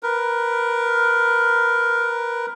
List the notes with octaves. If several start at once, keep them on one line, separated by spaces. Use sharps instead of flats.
A#4 B4